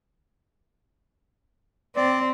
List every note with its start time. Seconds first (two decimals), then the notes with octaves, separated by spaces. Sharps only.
1.96 C4 D5